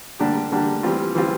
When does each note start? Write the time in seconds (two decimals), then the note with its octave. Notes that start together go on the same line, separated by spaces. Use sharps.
0.19 D3 G3 A#3 D4 G4
0.52 D3 G3 A#3 D4 G4
0.83 E3 G3 C4 F4
1.15 E3 G3 C4 F4